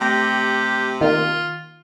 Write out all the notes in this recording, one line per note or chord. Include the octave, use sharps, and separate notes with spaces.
C3 A3 G4 G5 A#6
D#3 A#3 F4